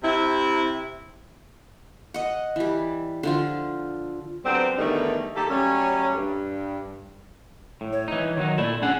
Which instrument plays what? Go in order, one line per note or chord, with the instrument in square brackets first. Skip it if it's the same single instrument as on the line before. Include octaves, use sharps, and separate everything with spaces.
[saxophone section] C3 E4
[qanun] D#5 F#5
E3 G3
D3 F3 F4
[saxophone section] D3 F#3 G3 B3 C4
E2 D3 D#3 G3 A3 D#4
D#3 A#3 G4 A4
F#3 G3 A3 C#4
G2 G3
[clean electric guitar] A2
[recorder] C#5
[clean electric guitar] E3 D#4
D#3 F#3 D#4
[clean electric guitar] A#2 A3 E4 [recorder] D5
[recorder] C#4 [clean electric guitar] D4 G#4 F#5